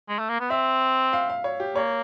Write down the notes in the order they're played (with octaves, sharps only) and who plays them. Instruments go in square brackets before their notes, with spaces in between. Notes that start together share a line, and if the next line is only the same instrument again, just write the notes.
[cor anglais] G#3
A3
A#3
B3
[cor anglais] C4 [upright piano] E5
[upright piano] F5
F5
C#5
G4
[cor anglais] A#3 [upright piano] C#5